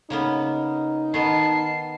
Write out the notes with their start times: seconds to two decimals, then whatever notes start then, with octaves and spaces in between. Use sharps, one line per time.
0.10 C#3 A#3 B3 D#4
1.14 D#3 B3 A5 C7